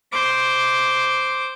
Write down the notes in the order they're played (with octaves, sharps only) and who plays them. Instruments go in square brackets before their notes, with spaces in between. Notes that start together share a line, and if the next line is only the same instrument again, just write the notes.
[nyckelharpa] C5 D6